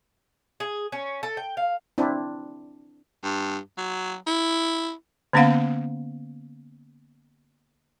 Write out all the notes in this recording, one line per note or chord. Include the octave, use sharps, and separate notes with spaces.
G#4
C#4
A4
G5
F5
C4 D4 E4
G2
F#3
E4
D3 A#3 B3 C#4 F5 F#5